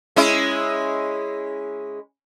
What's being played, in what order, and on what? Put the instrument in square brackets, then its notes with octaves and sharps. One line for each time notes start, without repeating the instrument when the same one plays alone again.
[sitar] G#3 C#4 E4